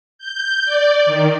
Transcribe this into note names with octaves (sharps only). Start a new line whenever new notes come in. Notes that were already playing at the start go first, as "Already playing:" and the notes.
G6
D5
D#3